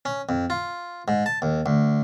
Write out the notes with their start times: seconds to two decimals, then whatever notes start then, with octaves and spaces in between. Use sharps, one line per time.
0.05 C#4
0.29 F2
0.50 F4
1.08 G#2
1.26 A5
1.42 D#2
1.66 D2